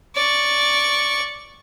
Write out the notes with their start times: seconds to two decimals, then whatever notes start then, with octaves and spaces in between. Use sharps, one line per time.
0.15 D5 C#6